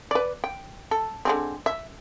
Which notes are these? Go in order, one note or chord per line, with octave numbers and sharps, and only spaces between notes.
B4 D5
G5
A4
D3 G#3 C4
E5